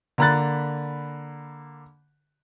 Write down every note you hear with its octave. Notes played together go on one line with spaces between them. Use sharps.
D3 A#3 A#5 B5 F#6 A6